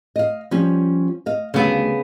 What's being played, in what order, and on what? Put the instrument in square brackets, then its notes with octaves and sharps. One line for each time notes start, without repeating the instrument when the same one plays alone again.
[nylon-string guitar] D#5 F5
F3 G3 C#4
D#5 F5
[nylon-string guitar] D2 G3 [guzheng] C#3 B3